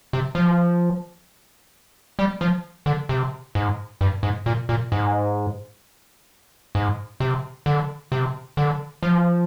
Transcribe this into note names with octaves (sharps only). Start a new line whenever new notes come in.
C3
F3
G3
F3
D3
C3
G#2
G2
G#2
A#2
A#2
G#2
G#2
C3
D3
C3
D3
F3